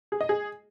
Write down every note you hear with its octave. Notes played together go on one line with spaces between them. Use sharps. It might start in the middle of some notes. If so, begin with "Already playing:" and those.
G#4
D#5
G#4